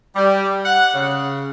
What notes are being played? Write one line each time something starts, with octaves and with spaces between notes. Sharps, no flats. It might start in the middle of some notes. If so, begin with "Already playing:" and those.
G3
F#5
C#3